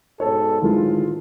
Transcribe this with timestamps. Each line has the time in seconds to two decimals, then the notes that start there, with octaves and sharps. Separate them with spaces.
0.20 G#2 B2 A4 C#5
0.62 A1 D3 D#3 G#3 E4 F4